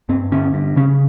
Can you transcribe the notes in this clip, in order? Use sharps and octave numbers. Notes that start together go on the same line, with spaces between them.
G2 C4
D3 C#4
G2
C#3 C#4